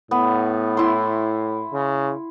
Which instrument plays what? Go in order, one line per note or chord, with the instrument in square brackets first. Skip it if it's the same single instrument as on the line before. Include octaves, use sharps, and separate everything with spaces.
[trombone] A2 [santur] B3
[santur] E4 C6
[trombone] C#3